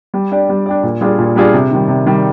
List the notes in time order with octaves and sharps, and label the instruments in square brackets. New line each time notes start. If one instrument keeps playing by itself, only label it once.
[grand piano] G3
D4 G4 D5
G3
D4 G4 D5
A#2
G3 D4 F4 G#4
A#2
G3 D4 F4 G#4
C3
D#3 G3
C3
D#3 G3